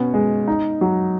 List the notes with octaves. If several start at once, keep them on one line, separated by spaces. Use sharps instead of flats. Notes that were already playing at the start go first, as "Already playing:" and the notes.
Already playing: B2 B3 C#4
G#3
D#4
F#3